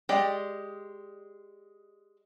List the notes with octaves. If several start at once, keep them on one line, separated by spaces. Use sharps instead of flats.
G#3 G4 D5 D#5 G5